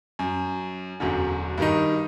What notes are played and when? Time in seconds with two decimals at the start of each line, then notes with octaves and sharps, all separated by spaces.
0.19 F#2
1.00 E1 F#2 D3
1.58 G2 D#3 D#4